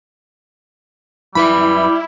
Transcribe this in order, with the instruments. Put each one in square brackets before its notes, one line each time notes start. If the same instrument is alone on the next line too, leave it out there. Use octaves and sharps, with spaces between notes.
[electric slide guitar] F#2 B4 E5 [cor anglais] G3 [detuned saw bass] E4 [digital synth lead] B5